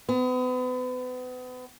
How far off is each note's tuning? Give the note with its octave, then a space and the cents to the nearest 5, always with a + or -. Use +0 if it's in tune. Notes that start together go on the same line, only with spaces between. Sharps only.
B3 +35